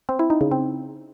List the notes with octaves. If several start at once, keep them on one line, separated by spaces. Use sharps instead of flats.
C4
E4
D#4
C#3
C4